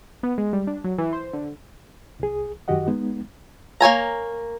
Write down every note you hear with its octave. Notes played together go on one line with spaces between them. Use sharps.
B3
G#3
G3
D4
F#3
E3
C5
D3
C2 G#4
F#2 D#3 F#4 G4 D#5 F#5
G#3 B3 D#4
A#3 C#5 G#5 A#5